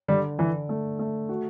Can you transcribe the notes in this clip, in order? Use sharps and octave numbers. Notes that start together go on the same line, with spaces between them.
D3 G3
D3 E3
A3
A3
F#4